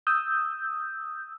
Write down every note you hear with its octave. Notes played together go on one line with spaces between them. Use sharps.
D#6 E6 G6